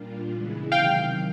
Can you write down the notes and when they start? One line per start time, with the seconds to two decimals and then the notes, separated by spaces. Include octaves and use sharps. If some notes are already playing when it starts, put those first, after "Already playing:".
Already playing: A#2 G3 A#3 D4 F4
0.32 C#3 E3 G#3 B3 E4
0.72 C3 D#3 F#3 F5 G5